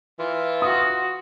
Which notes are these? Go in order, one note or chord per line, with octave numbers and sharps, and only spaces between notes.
E3 F4
F#4 D#6